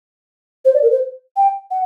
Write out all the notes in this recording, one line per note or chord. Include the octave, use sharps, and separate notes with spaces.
C5
D5
A#4
C5
G5
F#5